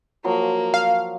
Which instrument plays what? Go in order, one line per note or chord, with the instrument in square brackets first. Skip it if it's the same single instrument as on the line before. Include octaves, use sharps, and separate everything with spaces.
[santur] F3 F#3 C6 [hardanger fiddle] A#3
[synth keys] F5